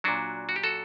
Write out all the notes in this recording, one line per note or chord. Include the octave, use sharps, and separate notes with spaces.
A#2 F#3 D4 F#4
F#4
G4
F#4 A4